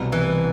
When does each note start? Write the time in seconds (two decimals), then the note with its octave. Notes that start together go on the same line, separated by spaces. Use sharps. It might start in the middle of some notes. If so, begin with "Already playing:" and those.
Already playing: C2 B2 B3
0.12 E3